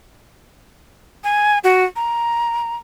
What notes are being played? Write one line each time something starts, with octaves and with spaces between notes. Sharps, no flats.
G#5
F#4
A#5